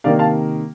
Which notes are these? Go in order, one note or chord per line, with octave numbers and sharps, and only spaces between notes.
C3 D#3 A#3 D5 F5
F5 A5